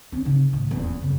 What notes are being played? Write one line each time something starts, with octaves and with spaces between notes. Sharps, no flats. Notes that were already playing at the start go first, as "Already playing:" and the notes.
C4 C#4
C#3 D#4
A2 D#3
D#1 E2
F#2 C#3